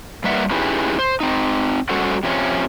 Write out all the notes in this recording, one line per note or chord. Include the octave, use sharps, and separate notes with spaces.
G3 A#3 B4 E5 F#5
C#4 D#4 E4 G4 G#4 B4
C5
C4 D#4
G3 C#4 F#4 A4 C5 F#5
C3 F3 C#4